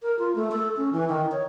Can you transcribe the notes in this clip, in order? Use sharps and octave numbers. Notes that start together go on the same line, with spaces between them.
A#4
F4
A3
A4
C#4
E3
D#3
C#5